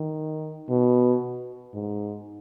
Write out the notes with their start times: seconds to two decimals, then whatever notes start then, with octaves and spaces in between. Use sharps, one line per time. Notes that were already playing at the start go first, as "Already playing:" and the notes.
Already playing: D#3
0.69 B2
1.74 G#2